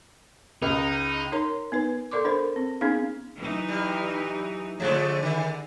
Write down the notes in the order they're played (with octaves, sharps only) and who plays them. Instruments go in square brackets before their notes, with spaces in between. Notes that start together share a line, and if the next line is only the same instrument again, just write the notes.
[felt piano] C#2 [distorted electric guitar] D#4
[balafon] D#4 A#4 C#5 A#5 C6
B3 D#4 B4
A4 A#4 D5 C6 D6
D4 A#4 C5
C4
B3 C#4 D#4 G#4 F5
[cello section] E3 F#3 D#4
[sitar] G3
[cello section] D3 [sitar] F3 G#3 A3
[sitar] D#3